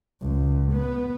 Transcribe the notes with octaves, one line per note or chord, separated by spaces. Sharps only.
C#2
B3